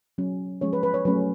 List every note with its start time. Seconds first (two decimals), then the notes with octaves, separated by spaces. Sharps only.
0.18 F#3 C#4
0.61 F3 G#3 C#4 C#5
0.73 B4
0.83 B4
0.94 C#5
1.05 F#3 A3 C#4 B4